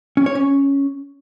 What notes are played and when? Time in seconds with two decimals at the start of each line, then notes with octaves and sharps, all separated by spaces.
0.17 C#4
0.26 C#5
0.35 C#4